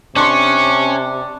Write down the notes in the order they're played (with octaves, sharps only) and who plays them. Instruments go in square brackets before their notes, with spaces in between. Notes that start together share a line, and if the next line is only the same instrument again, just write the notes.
[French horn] C3 [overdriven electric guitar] C#4 [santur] D4 C6 [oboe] C#6